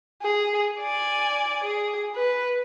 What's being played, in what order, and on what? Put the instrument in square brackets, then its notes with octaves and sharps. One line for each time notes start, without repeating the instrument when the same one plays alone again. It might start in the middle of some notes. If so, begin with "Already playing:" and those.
[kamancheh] G#4
D5 G#5
G#4
B4